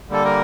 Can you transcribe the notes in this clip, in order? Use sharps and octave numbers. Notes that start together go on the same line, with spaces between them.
D3 G3 A#3 A4
A#4